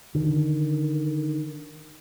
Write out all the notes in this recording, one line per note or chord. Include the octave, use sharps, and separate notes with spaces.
D3 D#3